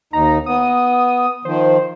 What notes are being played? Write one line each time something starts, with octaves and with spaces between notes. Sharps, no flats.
D#2 D#4 A#5
B3 D#6
D#3 F3 C5